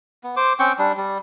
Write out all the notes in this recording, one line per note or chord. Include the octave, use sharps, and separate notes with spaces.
B3
C5 D6
C4 C#4 G5 C#6
G3 D4
G3